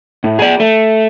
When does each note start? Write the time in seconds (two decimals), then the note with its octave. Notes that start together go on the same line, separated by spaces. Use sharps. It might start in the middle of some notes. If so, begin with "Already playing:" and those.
0.24 A2
0.39 G#4 D5
0.60 A3